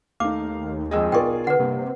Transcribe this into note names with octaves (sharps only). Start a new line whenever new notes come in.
D#2 A3 D#4 F5 D6
F2 G#3 G#4 D#5 G5 E6
B1 F4 G#4 A#4 D5 G5 C#6
D3 B4 F#5
G2 C3 A#3